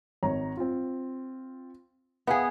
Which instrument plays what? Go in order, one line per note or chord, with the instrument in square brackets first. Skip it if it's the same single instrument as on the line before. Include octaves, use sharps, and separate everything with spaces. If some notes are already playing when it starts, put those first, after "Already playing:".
[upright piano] G#1 C#5 A#5
C4 F4
[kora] B3 G#4 [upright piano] E5 F5 G5